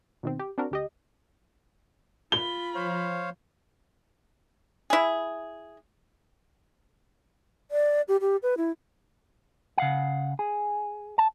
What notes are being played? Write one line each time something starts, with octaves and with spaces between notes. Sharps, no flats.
B2 D#3 C4
G4
C4 D4 F#4 A#4
D2 G4 D#5
F4 B5 G7
F3 C5 C#5 F5
E4 G#4
D5
G4
G4
B4
E4
C#3 F5 F#5
G#4
A5